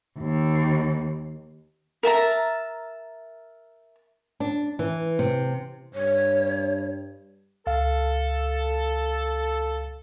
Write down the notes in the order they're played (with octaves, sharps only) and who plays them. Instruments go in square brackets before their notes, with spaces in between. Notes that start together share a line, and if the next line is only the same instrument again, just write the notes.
[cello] D#2
[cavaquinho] A#4 E5 A5 A#5
[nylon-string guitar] D4
E3
C3
[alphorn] G2 [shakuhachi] C#5
[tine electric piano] C#2 F5 [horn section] A4